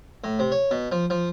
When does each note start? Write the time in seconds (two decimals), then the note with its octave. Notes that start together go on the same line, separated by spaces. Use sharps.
0.24 A2
0.39 C3
0.52 C#5
0.71 B2
0.92 F3
1.10 F3